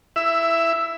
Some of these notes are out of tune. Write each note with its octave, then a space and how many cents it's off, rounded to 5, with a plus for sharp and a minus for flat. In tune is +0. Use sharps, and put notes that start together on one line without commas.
E4 +0 E5 +15